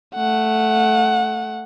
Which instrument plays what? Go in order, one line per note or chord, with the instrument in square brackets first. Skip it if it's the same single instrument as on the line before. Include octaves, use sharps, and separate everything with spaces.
[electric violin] A3 F#5